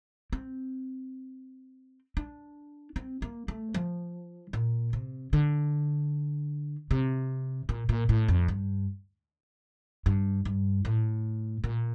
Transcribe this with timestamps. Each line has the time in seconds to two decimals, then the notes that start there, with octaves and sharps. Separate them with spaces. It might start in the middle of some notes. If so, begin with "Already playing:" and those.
0.33 C4
2.17 D4
2.96 C4
3.22 A#3
3.48 A3
3.74 F3
4.53 A#2
4.93 C3
5.33 D3
6.91 C3
7.69 A#2
7.89 A#2
8.09 A2
8.28 F2
8.48 G2
10.06 G2
10.45 G2
10.85 A2
11.64 A#2